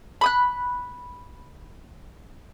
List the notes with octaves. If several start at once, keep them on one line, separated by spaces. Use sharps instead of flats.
B5 D#6 F#6